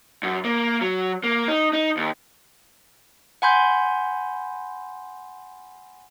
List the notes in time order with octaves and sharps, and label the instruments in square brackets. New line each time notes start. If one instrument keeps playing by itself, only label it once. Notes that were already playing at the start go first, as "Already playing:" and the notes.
[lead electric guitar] F#2
A#3
F#3
A#3
D#4
D#4
D#2
[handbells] F#5 G#5 B5 C6 G6